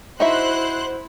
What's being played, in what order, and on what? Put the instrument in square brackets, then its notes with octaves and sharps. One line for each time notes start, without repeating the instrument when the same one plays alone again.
[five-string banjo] D#4 F#4 E5 [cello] E4 [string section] C5 F#6